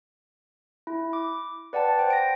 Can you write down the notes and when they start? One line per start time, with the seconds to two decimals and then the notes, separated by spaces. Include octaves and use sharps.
0.87 E4
1.13 D6
1.73 B4 D5 F#5 G5 A5
1.99 C5 G5
2.10 A#6 D7